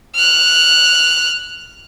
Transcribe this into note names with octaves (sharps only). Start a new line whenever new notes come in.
F6 F#6